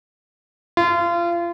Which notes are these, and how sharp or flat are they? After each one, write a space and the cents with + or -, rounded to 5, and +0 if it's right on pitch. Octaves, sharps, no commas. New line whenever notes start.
F4 -30